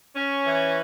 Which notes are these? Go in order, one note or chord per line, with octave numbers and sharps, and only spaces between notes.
C#4
E3